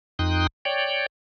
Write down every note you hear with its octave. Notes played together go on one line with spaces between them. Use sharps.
F2 D#4 G5 C6 D#6 F#6
C#5 D5 G5